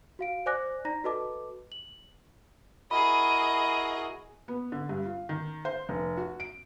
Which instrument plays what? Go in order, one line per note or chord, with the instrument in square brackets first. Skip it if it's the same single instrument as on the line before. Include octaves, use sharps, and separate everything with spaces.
[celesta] F#4 F5 D7
C5 D5 G#5 D6 F#6 A#6
D#4 D5 A#5 A#6
F#4 A4 B4 D#5 A5 D6
F#7
[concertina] E4 F#4 A#4 [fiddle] G#4 D#5 [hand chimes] B5
[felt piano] B3
D3
G2
F4
D#3
C5
F1
F#4
D7